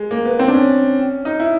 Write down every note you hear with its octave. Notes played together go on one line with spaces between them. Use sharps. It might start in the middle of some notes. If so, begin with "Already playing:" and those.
Already playing: G#3
A#3
B3
C4
D4
C#4
D#4
E4